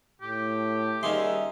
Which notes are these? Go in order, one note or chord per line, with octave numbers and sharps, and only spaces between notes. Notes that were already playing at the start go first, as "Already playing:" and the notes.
A2 G4
D#2 G3 C#4 D#4 G#4 E5 C6